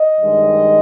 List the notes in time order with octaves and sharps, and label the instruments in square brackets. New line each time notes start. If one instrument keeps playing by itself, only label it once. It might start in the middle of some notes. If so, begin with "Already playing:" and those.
Already playing: [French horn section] D#5
G2 D#3 G#3